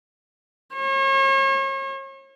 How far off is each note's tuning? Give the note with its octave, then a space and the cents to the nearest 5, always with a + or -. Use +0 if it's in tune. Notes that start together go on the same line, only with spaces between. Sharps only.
C#5 -40